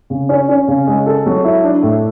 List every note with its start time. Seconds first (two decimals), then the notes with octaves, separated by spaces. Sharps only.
0.10 C#3
0.29 C#4
0.49 C#4
0.68 C#3
0.87 G#3
1.06 A4
1.26 F#3
1.44 E4
1.64 D4
1.83 A2